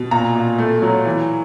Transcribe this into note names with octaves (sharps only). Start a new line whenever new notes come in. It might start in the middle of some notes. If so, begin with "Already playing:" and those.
Already playing: B2
A#2 A#5
A#2
A3
F#3
E3